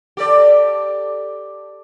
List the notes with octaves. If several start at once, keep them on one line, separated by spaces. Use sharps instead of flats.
G4 A4 D5